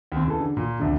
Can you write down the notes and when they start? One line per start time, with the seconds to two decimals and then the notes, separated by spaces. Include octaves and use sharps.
0.12 D#2 C4
0.26 C#3 E3 A4
0.40 D3
0.57 A#2
0.79 F1 D2 D3